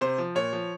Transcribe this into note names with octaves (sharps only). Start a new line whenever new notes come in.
C3 C5
F3
A#2 C#5
F3